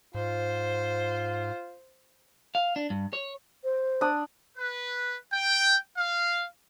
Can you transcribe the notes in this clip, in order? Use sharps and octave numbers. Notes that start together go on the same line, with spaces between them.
G#2 F4 C5
F5
D4
G2
C#5
C5
D4 D#6
B4
G5
F5